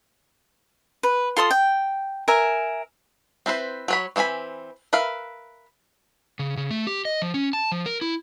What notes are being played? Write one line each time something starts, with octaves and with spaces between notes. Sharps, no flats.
B4
F4 A4 C6 D#6
G5
A#4 E5 G#5
C4 E4 B4 C5
F#3 C#5 B5
E3 C4 G#4 G#5 B5
A#4 B4 E5 F5
C#3
C#3
A3
G4
D#5
F3
C#4
A5
F3
A#4
E4